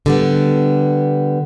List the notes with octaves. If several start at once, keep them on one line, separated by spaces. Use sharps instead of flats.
D3 G3 B3